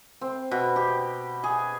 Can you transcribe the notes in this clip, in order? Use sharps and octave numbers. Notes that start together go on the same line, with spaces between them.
C4
B2
G4
G#4